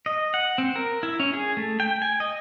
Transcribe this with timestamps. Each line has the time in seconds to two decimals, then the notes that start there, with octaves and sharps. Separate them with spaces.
0.06 D#5
0.34 F#5
0.58 C4
0.76 A#4
1.03 E4
1.20 C#4
1.34 G#4
1.57 A3
1.80 G5
2.02 G#5
2.20 D#5